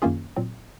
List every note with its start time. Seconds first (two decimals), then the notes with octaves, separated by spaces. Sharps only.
0.02 F#2 D#3 A#3 C#4 F4 G#4
0.36 A#2 F#3 C4